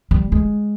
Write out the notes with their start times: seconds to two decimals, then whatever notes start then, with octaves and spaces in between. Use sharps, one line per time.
0.11 G3
0.32 G#3